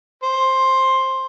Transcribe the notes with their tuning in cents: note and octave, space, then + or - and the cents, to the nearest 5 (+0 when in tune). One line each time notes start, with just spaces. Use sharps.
C5 +10